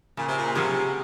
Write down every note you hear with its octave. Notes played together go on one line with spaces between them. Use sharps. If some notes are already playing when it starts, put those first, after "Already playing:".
A#2 C#3
C3
A#2
C3 F#3 C#4 F4 G#4